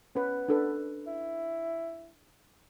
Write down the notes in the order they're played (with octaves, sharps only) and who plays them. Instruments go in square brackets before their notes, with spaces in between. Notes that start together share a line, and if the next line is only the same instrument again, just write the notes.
[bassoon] B3 [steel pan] C#4 B4
[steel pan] D4 A4 B4
[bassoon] E4